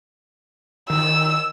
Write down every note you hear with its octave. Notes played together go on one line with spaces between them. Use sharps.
D#3 E6